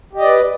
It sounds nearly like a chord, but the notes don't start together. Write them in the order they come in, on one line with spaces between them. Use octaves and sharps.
G4 D#5 D5 B4